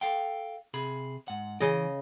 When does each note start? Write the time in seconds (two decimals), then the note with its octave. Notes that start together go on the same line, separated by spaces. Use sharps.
0.01 A4 F5 G5
0.74 C3 G#4 B5
1.28 G#2 F#5
1.60 C#3 E3 D#5